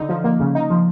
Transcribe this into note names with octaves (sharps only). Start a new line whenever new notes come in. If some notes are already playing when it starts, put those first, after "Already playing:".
Already playing: D3 D#4
F3
A#3
C#3
D#4
F3